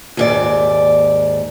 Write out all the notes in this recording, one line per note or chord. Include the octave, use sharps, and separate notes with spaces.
D#2 G#2 D5